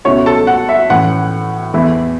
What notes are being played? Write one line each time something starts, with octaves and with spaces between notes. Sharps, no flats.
C#2 B2 A3 C#4 E4 C#5 C#6
A4 A5
F#5
E5
A2 E3 C#4 F#5
E2 E3 A3 E4